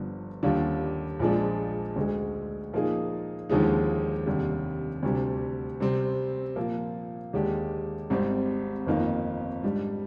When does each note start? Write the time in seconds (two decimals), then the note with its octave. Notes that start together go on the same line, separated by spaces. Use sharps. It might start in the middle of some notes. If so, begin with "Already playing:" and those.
Already playing: G1 G2 D3 F3
0.43 D#2 D3 G3 D4 F4
1.20 A#1 A#2 F3 G#3 D4
1.96 D2 D3 G#3
2.73 A#2 F3 A#3 D#4 G#4
3.49 D#2 D3 F3 G#3 D#4
4.26 F1 D#2 D3 G3
5.03 D2 C3 G3 D4
5.80 C3 G3 C4
6.56 A#2 F3 A#3
7.33 D#2 D3 G#3 D4 G4
8.10 G#1 G#2 G3 C4
8.87 G1 F2 D#3 A#3
9.63 G#2 G3 D4